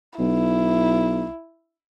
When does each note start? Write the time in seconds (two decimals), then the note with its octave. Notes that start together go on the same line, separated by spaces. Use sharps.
0.19 B1 E4